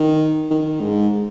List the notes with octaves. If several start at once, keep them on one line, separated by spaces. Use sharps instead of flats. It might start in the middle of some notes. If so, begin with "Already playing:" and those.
Already playing: D#3
D#3
G#2